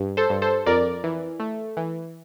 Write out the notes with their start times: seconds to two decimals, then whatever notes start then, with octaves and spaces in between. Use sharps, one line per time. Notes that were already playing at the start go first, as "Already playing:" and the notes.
Already playing: G2
0.17 A4 C5
0.30 G2
0.42 A4 C5
0.66 F2 A#4 D5
1.04 E3
1.40 A3
1.77 E3